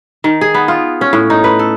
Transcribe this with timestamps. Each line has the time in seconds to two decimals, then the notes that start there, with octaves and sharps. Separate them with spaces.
0.24 D#3
0.41 G#4
0.54 B3
0.68 F4
1.01 C#4
1.13 A2
1.30 D#4
1.44 B4
1.59 A4